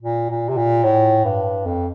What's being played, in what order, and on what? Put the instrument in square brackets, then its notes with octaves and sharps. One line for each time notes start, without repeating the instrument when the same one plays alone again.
[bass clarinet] A#2
A#2
C3
A#2
A2
G2
F2